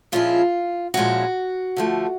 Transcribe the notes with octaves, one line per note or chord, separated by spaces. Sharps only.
A#2 F3 G#3 C#4 E4 F4
A#2 F3 G#3 C#4 E4 F#4
D3 F3 A3